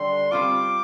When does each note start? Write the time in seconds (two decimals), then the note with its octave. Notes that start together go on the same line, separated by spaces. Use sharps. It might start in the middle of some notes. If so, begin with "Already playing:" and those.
Already playing: D3 G3 D4 G4 C6
0.31 G3 C4 F4 D6